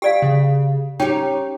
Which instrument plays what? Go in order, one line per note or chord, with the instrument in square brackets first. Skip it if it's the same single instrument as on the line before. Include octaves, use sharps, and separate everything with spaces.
[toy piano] G4 D5 F5 [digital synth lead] G5
[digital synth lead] C#3
[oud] C#4 G4 [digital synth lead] D#4 [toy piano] G5